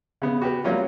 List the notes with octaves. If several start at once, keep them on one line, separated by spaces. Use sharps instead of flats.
C#3 B3
F#4 G4 B4
F#3 G3 A#3 C#4 F4